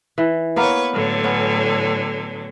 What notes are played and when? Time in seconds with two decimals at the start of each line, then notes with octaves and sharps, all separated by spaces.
0.18 E3
0.56 A#3 B3 A#4 B4 C#5
0.93 A2 D3 F#3
1.24 B3 C#4